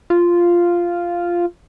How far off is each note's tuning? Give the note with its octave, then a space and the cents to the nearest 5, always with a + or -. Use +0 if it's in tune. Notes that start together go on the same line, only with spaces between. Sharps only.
F4 -5